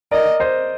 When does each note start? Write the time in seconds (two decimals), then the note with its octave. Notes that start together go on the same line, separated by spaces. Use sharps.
0.11 A#4 D5 D#5
0.40 C5 D#5